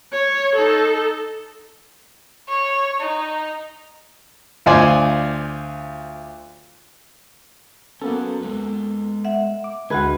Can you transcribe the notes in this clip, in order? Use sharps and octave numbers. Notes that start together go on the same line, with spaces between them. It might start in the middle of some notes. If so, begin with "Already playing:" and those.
C#5
D#4 A4
C#5
D#4
D2 F4 C5 D5 G#5
A#3 B3 C#4 F#4 A4
G#3 B4
E5 F#5
D6
D2 D3 G#3 F#4 B4 G#6